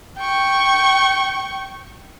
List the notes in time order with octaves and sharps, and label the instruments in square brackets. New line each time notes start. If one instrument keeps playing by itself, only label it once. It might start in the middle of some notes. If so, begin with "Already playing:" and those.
[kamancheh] G5 C#6